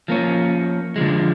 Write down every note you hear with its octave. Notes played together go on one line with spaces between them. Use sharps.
F3 A#3 C#4
D3 F3 G#3